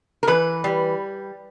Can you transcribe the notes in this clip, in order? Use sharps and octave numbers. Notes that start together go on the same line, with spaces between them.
A#4
E3 B4
G3